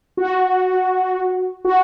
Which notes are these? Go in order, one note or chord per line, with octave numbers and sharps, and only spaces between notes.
F#4
F#4